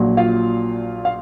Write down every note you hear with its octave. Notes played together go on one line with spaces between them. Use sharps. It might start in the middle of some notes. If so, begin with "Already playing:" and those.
Already playing: A#1 A#2 F#3
F4 F5
F5